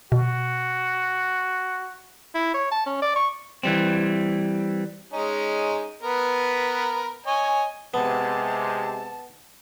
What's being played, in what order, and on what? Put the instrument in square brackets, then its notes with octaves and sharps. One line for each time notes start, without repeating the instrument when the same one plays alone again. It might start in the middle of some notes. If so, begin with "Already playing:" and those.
[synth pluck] B2 [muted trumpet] F#4
[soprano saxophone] E4
C#5
A5
C#4
D5
C#6
[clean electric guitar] E3 G3 C4
[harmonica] G#3 C#4 D#4
B3 A#4 B4
C#5 D#5 G#5
[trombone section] C3 G#3 [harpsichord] B3 [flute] A5